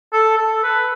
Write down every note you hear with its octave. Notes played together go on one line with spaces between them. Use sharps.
A4
A4
B4